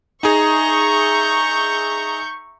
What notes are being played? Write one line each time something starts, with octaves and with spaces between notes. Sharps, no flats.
D#4 G#4 E5 A#5 C#6 G6